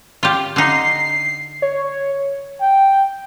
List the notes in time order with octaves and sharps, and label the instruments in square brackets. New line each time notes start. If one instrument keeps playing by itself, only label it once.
[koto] F4 G4
[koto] D3 D#4 [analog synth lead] C7
[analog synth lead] C#5
[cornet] G5